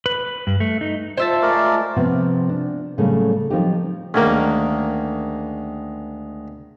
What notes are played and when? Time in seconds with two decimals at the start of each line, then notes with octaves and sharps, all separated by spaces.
0.06 B4
0.47 G2
0.60 A3
0.81 D#4
1.17 F4 C5 E5 A5
1.42 G#3 A3 A#4 D5
1.96 C3 F3 B3
2.49 D4
2.98 A2 C#3 F#3 G3 A3 A#3
3.50 F3 F#3 A#3 C4 D#4 G4
4.14 D2 D#3 G#3 A#3 C#4